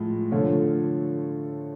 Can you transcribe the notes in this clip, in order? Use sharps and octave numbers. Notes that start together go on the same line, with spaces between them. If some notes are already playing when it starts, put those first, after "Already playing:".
Already playing: A2 F3 G#3
D3 F3 A3 C#5